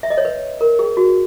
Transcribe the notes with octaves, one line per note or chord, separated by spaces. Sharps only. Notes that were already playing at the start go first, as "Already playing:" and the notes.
E5
D#5
C#5
B4
A#4
G#4
F#4